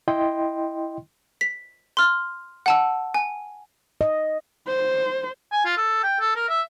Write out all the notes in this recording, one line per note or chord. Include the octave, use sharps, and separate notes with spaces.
E4 D#5 G5 C6
B6
C6 F6
F#5 A5 E6
G#5
D#5
C5
G#5
F4
A4
G5
A4
A#4
E5